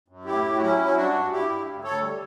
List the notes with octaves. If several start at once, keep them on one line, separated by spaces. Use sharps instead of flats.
F#2
A2 E4 G4
A2
F#4
F#3 C#4 E4
F#3 E4
G2 D4 F#4
G2
G2 E4 G4
G2
D2
D2 A4 C#5
G3